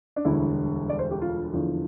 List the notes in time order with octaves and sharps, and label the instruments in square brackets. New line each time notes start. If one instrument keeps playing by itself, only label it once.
[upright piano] D4
E1 D2 D3 G3 E4
D5
C5
G4
F4
F1 E2 D3 F3